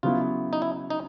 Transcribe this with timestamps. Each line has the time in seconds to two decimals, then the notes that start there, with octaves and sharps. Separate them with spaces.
0.03 C#3 F#3 B3 E4 F4
0.53 D#4
0.62 E4
0.90 D#4